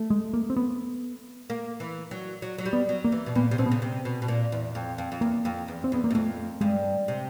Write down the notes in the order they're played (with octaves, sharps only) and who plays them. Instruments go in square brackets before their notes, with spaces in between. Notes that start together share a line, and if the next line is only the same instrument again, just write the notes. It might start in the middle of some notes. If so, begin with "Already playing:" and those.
Already playing: [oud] A3
[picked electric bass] G#3
A#3
C4
B3
[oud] A#3
E3
F#3
F#3
F#3
G3
[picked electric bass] B3
[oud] F#3
[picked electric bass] A#3
[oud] E3
B2
[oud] A#2 [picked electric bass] B3
[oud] C3
[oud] B2 [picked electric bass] C4
[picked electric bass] B3
[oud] C#3
C3
B2
B2
A#2
E2
F2
F2
F2
[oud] E2 [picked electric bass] A#3
[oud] F2
E2
[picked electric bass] C4
[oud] E2 [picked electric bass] B3
[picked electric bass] A#3
[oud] F#2
[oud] F2 [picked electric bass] A3
[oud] G2 [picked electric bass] G#3
[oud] C3